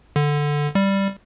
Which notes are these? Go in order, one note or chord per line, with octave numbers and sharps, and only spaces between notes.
D3
G3